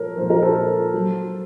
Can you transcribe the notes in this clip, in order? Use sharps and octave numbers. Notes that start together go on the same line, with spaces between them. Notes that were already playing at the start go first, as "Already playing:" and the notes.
Already playing: A#2 F3 A4 A#4 C#5
A#2 F3 C5
A#4
A4 C5
F#3